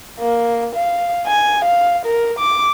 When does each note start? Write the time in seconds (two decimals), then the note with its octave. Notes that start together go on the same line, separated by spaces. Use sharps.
0.20 A#3
0.75 F5
1.27 G#5
1.65 F5
2.06 A#4
2.39 D6